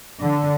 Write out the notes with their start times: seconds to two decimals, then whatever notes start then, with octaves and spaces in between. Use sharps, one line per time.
0.22 D3